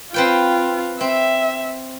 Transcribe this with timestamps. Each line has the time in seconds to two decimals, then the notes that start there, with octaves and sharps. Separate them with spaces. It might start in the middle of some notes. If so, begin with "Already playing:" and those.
0.14 C4 F4 B4 G5
1.01 C4 E5